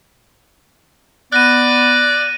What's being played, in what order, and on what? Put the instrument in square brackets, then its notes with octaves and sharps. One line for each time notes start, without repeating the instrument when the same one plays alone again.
[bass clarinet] B3 [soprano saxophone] D5 [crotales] F#6 A#6 D#7